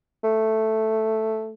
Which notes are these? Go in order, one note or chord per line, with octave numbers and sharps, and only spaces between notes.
A3